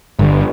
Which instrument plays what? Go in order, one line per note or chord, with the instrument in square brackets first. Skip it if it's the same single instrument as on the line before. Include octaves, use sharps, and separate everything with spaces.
[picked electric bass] G1